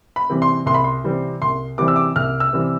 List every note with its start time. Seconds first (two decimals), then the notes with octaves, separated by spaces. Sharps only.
0.16 B5
0.30 C3 E3 G3 C4
0.42 C6
0.66 C2 C6
0.74 B5
0.84 C6
1.04 C3 E3 G3 C4
1.42 C2 C6
1.78 C3 E3 G3 C4 D6
1.88 E6
1.96 D6
2.16 C2 F6
2.40 E6
2.53 C3 E3 G3 C4